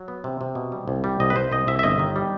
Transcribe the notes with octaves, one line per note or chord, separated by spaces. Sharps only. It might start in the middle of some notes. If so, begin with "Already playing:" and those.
Already playing: F#3
B3
C3
C3
B2
G3
C2
G3
C2 D#5
B4
C2 C5
C2 D#5
C2 E5
E5
G1 D#5
D#3
G3